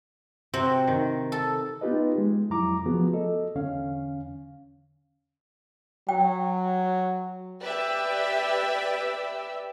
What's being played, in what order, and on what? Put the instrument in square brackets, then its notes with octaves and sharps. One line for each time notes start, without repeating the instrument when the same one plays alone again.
[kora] C3 F#4 [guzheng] C4
[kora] D#3
[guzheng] A4
[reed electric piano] B3 D#4 F4 G4 B4 D#5
G#3
F2 F#3 E4 A#5 D6
F3 A3 B3 F4 F#4 G#4
A4 D#5
E2 D3 C#4 F5
[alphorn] F#3 [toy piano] G5
[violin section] G4 B4 D5 E5 E6